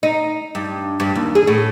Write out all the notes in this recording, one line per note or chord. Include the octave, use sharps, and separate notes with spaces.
D#4
G2
G2
D#2
G#4
A2